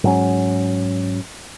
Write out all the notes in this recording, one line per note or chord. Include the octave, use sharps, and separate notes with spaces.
G#2 F#3 C#4